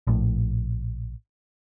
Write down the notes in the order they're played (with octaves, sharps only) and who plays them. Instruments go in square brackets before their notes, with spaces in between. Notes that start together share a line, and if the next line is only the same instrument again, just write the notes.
[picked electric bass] A#1 A2